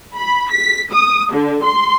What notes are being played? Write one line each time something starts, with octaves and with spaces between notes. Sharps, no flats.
B5
B6
D#6
D3
C6